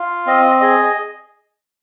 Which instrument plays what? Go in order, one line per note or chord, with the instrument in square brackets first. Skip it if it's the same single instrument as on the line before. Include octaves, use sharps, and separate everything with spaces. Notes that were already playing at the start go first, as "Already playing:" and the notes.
Already playing: [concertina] F4
C4 D#5
G#4 D#5
D#5